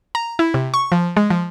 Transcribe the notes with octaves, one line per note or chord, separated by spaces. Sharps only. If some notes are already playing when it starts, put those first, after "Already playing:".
A#5
E4
C3
C#6
F3
G#3
F3